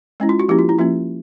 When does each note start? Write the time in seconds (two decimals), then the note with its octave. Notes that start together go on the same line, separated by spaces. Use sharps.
0.20 G#3 C#4 E4
0.29 F4
0.39 F#4
0.49 F3 A#3 C#4 E4 G4
0.59 F4
0.69 E4
0.78 F3 A#3 C#4 F4